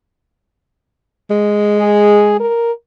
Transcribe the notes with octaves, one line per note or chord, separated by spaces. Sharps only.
G#3
G#4
A#4